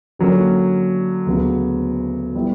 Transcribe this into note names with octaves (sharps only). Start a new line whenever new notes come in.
D3 F#3 A#3 C#4
D2 C#3 F#3 B3
G3 B3 E4